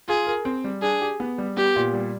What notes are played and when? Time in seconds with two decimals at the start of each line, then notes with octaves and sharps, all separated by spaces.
0.08 F4 G#4
0.27 A#4
0.45 C4
0.64 G3
0.82 D4 G#4
1.01 G4
1.20 B3
1.38 G3
1.57 B3 G4
1.76 A#2
1.93 G3